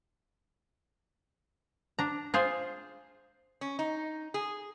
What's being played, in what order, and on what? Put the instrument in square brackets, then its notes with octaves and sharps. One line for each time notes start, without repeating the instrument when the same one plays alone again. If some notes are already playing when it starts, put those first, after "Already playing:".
[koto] D4 A#5
F4 G#4 C5
[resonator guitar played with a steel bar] C#4
D#4
G#4